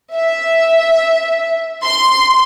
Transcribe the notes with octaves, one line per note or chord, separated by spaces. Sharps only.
E5
C6